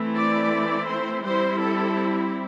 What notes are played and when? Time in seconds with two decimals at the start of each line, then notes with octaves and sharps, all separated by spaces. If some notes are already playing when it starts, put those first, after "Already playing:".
Already playing: E3 A3 C4 E4
0.16 D5
0.89 C5
1.24 G3 C4 E4 C5
1.61 A4